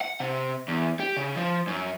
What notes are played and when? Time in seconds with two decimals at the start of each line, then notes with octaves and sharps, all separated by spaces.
0.01 F#5
0.20 C3
0.68 E2
1.00 G4
1.17 C#3
1.36 F3
1.67 F#2